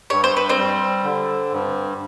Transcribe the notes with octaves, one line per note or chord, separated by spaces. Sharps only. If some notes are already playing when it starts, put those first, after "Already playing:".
G2 C#5
C5
B4
C4 C5
G3
D3
G2